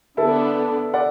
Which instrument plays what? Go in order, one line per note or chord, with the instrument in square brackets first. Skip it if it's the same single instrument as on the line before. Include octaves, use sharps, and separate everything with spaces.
[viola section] D3 B3 D4 [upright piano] E4 A4
[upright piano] D5 F#5